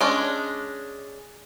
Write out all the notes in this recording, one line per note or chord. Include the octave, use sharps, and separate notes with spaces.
G#3 C#4 D4